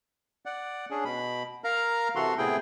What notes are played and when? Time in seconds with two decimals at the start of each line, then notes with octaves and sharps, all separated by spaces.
0.46 D5 F#5
0.91 C#4 D4 G#4
1.05 B2 B5
1.64 A#4 F5 A#5
2.15 C3 E3 F#4 A4 C6
2.38 A2 C3 B3 E4 G#4 G5